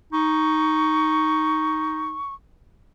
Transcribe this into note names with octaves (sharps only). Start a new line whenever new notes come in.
D#4 C#6